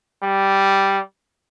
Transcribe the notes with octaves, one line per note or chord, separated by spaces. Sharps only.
G3